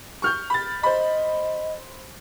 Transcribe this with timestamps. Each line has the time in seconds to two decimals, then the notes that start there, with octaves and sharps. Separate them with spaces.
0.22 C#6 F6 G6
0.50 B5 A6
0.83 C5 D#5 B5